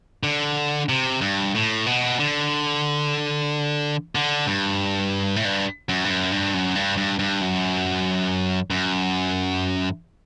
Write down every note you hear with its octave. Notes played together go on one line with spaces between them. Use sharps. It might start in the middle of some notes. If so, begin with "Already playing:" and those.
D3
C3
G2
A2
B2
D3
D3
G2
A2
G2
F#2
G2
F#2
G2
F#2
G2
G2
G2
F#2
F#2